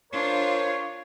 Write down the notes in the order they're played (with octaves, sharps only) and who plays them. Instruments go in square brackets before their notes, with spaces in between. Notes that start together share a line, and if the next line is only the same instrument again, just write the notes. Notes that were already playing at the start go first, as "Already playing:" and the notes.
[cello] D4 F4 [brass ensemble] A#4 C5 C#5